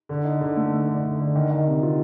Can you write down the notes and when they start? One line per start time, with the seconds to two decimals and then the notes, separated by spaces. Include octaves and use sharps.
0.09 D3
0.24 D#4
0.41 D3
0.56 A3
0.72 A3
0.88 D3
1.03 D3
1.20 D3
1.35 D#3
1.50 D#3
1.66 C3
1.82 F4